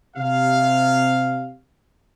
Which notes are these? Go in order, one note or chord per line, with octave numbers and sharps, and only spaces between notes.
C3 F5